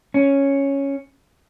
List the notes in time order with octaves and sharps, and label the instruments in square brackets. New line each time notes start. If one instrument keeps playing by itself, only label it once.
[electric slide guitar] C#4